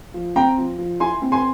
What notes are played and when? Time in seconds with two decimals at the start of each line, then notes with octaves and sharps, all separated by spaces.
0.14 F3
0.36 C4 G5 A#5
0.58 F3
0.79 F3
1.00 E4 G#5 C6
1.22 C4
1.32 G#5 C6